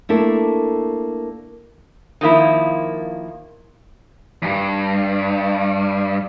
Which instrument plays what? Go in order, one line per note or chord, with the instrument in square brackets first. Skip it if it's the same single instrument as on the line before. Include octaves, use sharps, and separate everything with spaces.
[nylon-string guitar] A3 A#3 D4 E4 A4
[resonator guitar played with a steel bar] D#3 F3 A#3 E4
[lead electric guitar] E2 G2